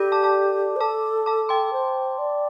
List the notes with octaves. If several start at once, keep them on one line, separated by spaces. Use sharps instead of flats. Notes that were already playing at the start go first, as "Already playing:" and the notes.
Already playing: G4 A4 D5
A5 D6
A5 D6
C5
A4 A5 D6
A5 D6
G5 C6
C5
D5